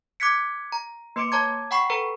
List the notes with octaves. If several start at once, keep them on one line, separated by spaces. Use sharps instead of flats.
D6 F#6 G#6 B6 C#7
A#5
A#3 B4 C6 D6 C#7 D7
C#5 A5 A#5 D6 G#6
F#5 G5 B5 C#6 C7
A4 B4 A#5